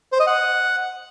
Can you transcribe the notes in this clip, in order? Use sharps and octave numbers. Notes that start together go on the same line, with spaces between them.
C5
D#5
F#5